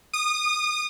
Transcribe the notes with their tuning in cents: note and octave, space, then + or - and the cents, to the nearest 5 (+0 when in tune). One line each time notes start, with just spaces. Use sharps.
D#6 -30